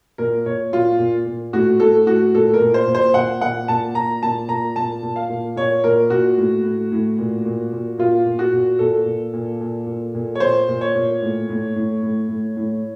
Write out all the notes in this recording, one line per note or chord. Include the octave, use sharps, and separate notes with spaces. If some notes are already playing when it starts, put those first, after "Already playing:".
A#2 A#4
A#2 C#5
A#2 F4
A#2
A#2
A2 F#4
A2 A4
A2 F#4
A#2 A4
A#4
A#2
C5
A#2
C5
A#2 F#5
A#2 F#5
A#2 A5
A#2 A#5
A#2 A5
A#2 A#5
A#2 A5
A#2
F5
A#2
A#2 C#5
A#2 A#4
A#2 F#4
A2
A2
A2
A#2
A#2
A#2
A#2 F4
A#2
F#4
A#2
A#2 A4
A#2
A#2
A#2
A#2
A#2
C#5
A#2 C5
A#2
C#5
A#2
A2
A2
A2
A2
A2
A2